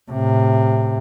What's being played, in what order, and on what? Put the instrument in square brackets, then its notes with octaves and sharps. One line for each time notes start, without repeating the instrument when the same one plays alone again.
[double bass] A2 C3